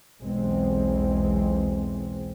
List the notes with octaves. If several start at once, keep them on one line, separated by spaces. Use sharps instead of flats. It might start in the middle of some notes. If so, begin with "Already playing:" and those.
B1 E2 E3 G#3 C4